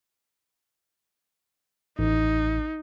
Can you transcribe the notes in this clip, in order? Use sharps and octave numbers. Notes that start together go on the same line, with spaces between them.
A1 D#4